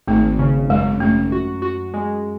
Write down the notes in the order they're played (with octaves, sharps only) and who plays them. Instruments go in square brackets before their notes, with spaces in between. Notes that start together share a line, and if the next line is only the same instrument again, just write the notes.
[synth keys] G#1 [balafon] A3
[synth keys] C#3
[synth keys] F#2 [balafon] G#3
[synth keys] F#2 [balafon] A3
[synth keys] F#4
F#4
G#3